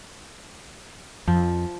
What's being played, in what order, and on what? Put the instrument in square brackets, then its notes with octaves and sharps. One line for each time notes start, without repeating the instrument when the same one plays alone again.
[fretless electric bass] F2 [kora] F3